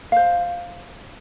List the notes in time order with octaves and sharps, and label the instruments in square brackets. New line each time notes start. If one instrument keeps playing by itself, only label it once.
[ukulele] C5 F5